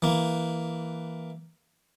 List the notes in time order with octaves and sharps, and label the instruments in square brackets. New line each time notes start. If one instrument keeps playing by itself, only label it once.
[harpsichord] E3 A#3